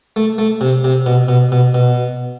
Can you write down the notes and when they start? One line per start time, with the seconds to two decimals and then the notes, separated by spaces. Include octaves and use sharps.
0.16 A3
0.38 A3
0.61 C3
0.84 C3
1.06 B2
1.28 B2
1.52 B2
1.74 B2